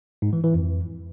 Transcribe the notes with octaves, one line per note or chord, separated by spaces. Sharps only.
G#2
E3
E3
F2